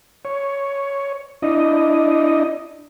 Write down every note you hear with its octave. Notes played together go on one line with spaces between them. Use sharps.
C#5
D4 E4 D#5